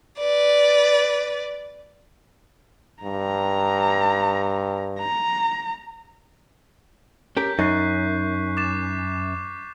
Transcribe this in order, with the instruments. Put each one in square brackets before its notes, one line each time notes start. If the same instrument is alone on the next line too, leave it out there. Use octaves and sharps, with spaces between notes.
[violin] B4 D5
[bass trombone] G2 [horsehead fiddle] A#5
[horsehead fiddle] A#5
[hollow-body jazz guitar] C#4 G4 A#4 [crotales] G6 B6
[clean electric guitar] F#2 [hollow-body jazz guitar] D#4 [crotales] C#6 F#6 C7
[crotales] D6 A6 E7